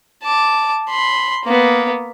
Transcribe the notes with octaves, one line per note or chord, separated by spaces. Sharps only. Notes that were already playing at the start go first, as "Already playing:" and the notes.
A5 D6
B5 C6
A#3 B3